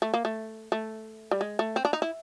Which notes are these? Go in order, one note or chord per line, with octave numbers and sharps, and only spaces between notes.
A3
A#3
A3
A3
G3
G#3
A3
C4
D4
D#4
E4